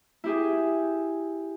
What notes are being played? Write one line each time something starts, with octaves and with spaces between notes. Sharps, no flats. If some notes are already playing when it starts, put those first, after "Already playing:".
E4 G4 G#4